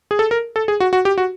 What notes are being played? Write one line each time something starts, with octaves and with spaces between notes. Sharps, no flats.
G#4
A4
A#4
A4
G#4
F#4
F#4
G4
F#4